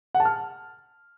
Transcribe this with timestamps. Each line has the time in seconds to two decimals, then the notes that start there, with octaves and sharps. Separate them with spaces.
0.15 F#5
0.20 A5
0.25 F6